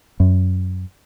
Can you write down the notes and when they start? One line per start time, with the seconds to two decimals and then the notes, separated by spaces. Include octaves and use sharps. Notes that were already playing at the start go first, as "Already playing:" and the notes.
0.20 F#2